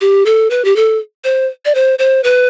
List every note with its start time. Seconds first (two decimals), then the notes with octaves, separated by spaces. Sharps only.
0.01 G4
0.26 A4
0.50 B4
0.64 G4
0.76 A4
1.24 C5
1.65 D5
1.75 C5
1.99 C5
2.24 B4